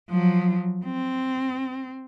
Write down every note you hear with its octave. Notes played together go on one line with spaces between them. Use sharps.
F3 F#3
C4